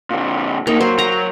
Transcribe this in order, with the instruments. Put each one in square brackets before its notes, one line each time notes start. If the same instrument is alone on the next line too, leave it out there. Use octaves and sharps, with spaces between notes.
[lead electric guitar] A#2 D3
[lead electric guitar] D2 D#4 [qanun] A#3
[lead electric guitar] F#3 [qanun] C5
[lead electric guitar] F#3 [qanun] A#5